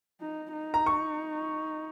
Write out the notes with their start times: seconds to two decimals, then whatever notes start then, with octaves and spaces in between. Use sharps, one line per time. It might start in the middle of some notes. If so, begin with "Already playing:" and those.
0.21 D#4
0.53 D#4
0.74 A#5
0.86 C#6